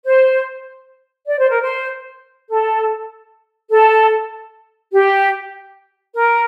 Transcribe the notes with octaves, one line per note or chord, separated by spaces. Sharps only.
C5
D5
C5
A#4
C5
A4
A4
G4
A#4